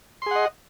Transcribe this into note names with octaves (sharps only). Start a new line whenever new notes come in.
G#4 D#5 F#5 C6